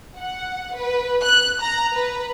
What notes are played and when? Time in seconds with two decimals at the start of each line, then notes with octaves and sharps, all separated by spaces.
0.17 F#5
0.75 B4
1.22 F#6
1.61 A#5
1.94 B4